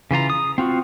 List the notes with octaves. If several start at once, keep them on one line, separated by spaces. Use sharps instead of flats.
C#3 E3 F4 A#5
D#6
C4 F4 F#4